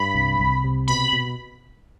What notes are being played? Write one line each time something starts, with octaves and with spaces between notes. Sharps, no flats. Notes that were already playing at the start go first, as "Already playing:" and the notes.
Already playing: G2 B5
C2
C2
C3
B2 B5
B2